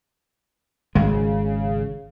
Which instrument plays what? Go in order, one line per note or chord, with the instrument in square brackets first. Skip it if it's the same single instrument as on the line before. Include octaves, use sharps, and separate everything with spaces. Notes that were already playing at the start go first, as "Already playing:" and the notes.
[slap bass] G#1 G#3 [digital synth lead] C#3